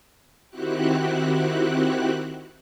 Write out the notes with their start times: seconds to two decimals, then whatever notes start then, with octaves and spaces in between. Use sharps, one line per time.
0.50 D#3 C4 E4 F#4 G4 F#6